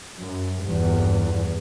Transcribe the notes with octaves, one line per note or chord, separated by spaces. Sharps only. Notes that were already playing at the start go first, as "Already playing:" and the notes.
F#2
G1 E2 G2